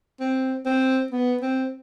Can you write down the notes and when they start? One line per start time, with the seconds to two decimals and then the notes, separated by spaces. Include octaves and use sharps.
0.20 C4
0.65 C4
1.12 B3
1.42 C4